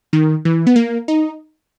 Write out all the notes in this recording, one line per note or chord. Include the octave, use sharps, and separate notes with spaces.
D#3
E3
B3
A#3
D#4